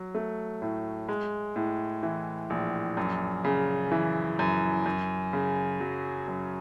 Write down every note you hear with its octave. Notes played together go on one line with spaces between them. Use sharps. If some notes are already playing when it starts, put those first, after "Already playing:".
Already playing: F#3
A3
A2
G#3
A2
E3
A#1
F#2
C#3
E3
F#2
F#2
C#3
F#3
F#2